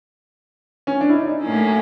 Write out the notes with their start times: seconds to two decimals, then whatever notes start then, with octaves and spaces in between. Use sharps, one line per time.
0.87 C#4
1.01 D4
1.09 E4
1.14 D#4
1.27 D#4
1.41 A2 F#3 A#3 C#4